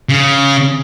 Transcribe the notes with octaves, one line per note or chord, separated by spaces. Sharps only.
C#3